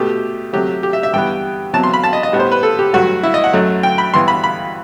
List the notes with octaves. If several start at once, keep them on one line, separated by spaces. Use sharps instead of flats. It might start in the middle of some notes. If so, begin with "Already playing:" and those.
Already playing: B2 A3 G4
C3 F#3 A3 G4
G4
E5
E5
G2 E3 G3 B3 G5
E2 C3 F#3 A5
C6
B5
A5
D#5
D#5
A2 G3 B3
C5
B4
A4
G4
G2 F#3 A3 F#4
E4
D#5
F#5
F#2 F#3 A3
G5
B5
G2 E3 B3 C6
B5
B5